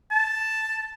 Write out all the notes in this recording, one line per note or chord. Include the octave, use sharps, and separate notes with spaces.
A5